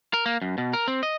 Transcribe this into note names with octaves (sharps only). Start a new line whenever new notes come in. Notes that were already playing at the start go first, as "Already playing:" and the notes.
A#4
A#3
F#2
B2
A#4
C4
D#5